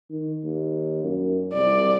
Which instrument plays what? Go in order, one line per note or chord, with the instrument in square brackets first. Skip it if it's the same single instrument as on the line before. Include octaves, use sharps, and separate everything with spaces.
[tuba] D#3
D#2
F#2
[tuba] C2 [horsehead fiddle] D5